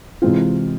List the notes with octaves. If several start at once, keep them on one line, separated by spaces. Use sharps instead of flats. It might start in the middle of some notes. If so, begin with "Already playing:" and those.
C3 E3 G#3 C4 F4